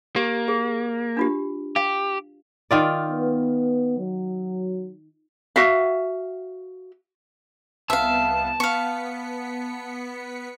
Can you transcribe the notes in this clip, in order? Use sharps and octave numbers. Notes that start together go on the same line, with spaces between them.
A#3 G4
G#4
D4 F4 G4
G4 F5
D#3 F4 D5
B3
F#3
F#4 E5 F5
C2 B3 E5 F5 A5
B3 F5 C#6 B6 C#7